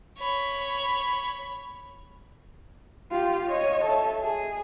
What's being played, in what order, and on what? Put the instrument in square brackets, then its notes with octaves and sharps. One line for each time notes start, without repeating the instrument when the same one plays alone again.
[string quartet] C#5 B5
[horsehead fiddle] F4 G4
C#5 D#5
A4 E5
G#4